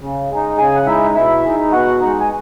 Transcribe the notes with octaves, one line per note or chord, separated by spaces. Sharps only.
C#3
G#3 D#4
C#3 G#4 G#5
F#5
G#3 D#4 E4 E5
B2 E4 E5
G#3 D#4
B2 F#4 F#5
G#3 D#4
G#5